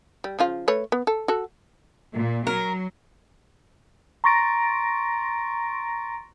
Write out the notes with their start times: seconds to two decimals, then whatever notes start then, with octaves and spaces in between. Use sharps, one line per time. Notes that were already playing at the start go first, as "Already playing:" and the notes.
0.24 G3
0.39 C#3 F3 F4
0.68 A3 B4 C#5
0.92 B3
1.07 A4
1.28 F#4 A4
2.14 A#2
2.47 F#3 A#4
4.24 A#5 C6 C#6 A6 A#6 D7